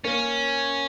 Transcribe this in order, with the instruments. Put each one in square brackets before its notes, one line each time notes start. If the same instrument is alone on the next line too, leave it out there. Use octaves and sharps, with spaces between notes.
[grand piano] A#3 [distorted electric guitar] C#4